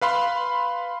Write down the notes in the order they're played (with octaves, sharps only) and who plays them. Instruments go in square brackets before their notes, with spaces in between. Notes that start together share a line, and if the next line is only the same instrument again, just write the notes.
[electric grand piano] B4 F5 B5 C6